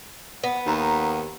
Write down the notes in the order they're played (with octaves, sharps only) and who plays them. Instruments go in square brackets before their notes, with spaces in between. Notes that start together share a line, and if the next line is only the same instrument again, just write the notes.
[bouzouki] B3 [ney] F#5
[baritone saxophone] D#2 [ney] A#5